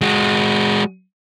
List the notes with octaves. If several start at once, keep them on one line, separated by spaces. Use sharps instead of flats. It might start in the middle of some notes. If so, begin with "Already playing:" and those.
G#3 F#4